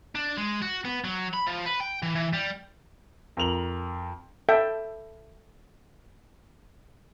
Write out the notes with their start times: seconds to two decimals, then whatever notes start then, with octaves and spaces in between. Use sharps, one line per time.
0.15 D4
0.37 G#3
0.62 F#4
0.85 B3
1.05 F#3
1.33 B5
1.47 F3
1.65 B4
1.80 G5
2.03 E3
2.15 E3
2.33 G3
3.37 F2 A#4 F7 F#7
4.49 A4 E5 G5